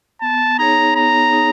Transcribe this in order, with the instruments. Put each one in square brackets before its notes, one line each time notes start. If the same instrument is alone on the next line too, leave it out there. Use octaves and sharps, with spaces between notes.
[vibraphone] B3 [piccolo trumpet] A5
[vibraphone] D#4 G#4 C#5 [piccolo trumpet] A#5
[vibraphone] B3 [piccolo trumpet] A#5
[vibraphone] D#4 G#4 C#5